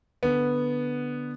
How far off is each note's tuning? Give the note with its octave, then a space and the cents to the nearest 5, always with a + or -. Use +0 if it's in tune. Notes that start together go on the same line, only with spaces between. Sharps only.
D3 +0 B3 -5